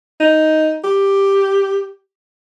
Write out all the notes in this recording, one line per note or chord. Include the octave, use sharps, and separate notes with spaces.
D#4
G4